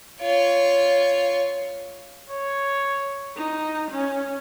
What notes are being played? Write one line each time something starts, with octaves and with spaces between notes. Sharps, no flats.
F4 C#5
C#5
D#4
C#4